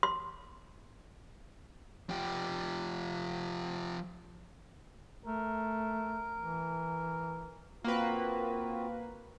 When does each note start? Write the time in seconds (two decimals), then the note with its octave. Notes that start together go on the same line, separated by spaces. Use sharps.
0.03 C6
2.09 F3 G4
5.26 A3 A#4
6.40 E3
7.84 A#3 C4 F4 F#4 B4